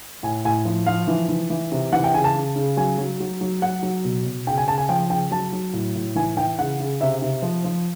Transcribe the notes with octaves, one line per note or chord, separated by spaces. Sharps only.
A2 G#5
A2 G#5
F3
F3 F5
E3
E3
E3
C3
E3 F#5
G5
C#3 G#5
A5
C#3
C#3
F#3 G#5
F#3
F#3
F#3
F#3 F#5
F#3
B2
B2
C#3 G5
G#5
C#3 A5
G#5
F3 G5
C#3 G5
F#3 A5
F#3
A2
A2
E3 G#5
E3 G5
C#3 F#5
C#3
C3 E5
C3
F3
F3